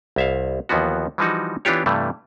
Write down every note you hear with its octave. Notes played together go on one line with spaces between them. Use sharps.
C2 E5 F5
D#2 E3 F3 B3 F#4
E3 F3 G3 D#4 F#4
E3 B3 D4 F4 G4 C#5
G2 C3 E3 G3 A3